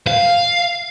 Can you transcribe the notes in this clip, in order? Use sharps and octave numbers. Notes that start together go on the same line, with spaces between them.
F5